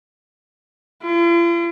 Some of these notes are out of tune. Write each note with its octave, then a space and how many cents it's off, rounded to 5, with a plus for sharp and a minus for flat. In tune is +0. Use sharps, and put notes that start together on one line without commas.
F4 -45